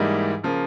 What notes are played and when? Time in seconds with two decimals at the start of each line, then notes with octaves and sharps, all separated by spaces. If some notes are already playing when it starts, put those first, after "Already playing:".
Already playing: G#2 E3 G3 A#3 D#4
0.43 C#3 F3 A#3